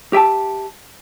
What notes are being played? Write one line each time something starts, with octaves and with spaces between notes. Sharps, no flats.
G4 E5 G5 A5